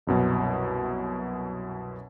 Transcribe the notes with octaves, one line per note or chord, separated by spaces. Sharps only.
C2 F#2 B2